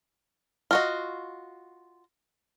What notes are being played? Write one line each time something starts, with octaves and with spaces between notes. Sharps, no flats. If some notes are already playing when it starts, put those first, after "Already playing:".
F4 F#4 D#5